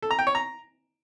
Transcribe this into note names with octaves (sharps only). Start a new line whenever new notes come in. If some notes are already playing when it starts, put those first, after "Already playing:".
A4
A#5
G5
C#5
A#5